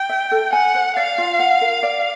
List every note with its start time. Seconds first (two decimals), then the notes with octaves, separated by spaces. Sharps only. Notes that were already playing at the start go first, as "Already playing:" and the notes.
Already playing: G5
0.09 E5
0.31 A4
0.53 F#5 G#5
0.75 C5
0.97 D5 F5
1.18 F4
1.39 F#5
1.61 A#4
1.83 D5